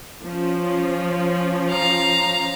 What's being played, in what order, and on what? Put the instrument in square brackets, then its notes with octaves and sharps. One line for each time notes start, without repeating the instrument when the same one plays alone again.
[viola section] F3 C#4
[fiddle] F5 A#5